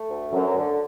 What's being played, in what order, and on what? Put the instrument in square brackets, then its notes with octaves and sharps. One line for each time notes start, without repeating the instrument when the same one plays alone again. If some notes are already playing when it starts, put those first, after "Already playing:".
Already playing: [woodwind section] A3
D2
[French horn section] F#2 [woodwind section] F#3
[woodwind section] D3